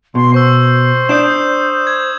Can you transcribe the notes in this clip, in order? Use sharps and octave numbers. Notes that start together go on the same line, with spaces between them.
B2 C6
C5 C#6 E6
D4 D5 D#6 G6 E7
G#6